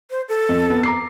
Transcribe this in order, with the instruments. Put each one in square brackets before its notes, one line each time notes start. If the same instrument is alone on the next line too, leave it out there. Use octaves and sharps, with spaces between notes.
[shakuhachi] C5
A4
[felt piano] F2
B3
A#5 D6 C7